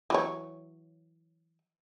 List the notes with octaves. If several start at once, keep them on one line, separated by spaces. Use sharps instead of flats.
E3 F#3 C#5